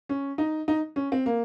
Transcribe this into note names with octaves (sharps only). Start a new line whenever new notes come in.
C#4
D#4
D#4
C#4
C4
A#3